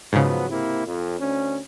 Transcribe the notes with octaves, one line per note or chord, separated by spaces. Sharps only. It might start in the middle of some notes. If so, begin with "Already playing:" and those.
G#2 C#3 F3 F#3 B3
C3 A#3 E4
F2
D2 C#4